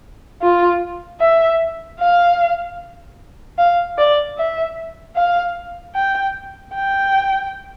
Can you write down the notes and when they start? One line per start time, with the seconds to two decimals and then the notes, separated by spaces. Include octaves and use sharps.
0.42 F4
1.21 E5
2.00 F5
3.58 F5
3.98 D5
4.37 E5
5.16 F5
5.95 G5
6.74 G5